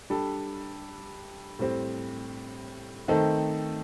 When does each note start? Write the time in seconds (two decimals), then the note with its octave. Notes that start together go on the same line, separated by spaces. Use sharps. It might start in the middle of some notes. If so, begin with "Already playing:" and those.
0.10 G3 D4 A4
1.59 A2 G3 C4
3.08 D#3 A3 C4 D#4 A4